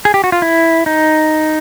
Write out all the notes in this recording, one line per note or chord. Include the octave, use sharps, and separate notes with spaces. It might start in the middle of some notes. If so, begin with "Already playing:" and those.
G#4
G4
F#4
F4
E4
D#4